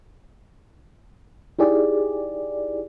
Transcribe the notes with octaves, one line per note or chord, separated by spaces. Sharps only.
D#4 E4 G4 G#4 D5